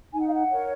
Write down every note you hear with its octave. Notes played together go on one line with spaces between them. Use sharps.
D#4 G#5
F#5
F5
F#5
A#4 C#5